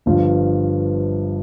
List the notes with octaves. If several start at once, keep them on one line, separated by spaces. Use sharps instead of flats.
G1 G2 F3